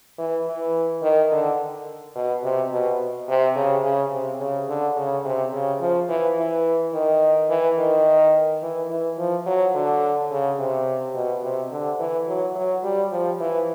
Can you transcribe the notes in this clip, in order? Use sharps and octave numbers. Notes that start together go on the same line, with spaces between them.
E3
E3
D#3
D3
B2
C3
B2
C3
C#3
C#3
C3
C#3
D3
C#3
C3
C#3
F3
E3
E3
D#3
E3
D#3
E3
E3
F3
F#3
D3
C#3
C3
B2
C3
D3
E3
F#3
F#3
G3
F3
E3